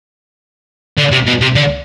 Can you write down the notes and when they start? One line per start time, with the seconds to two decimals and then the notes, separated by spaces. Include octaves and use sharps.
0.98 D3
1.12 C3
1.27 B2
1.41 C3
1.55 D3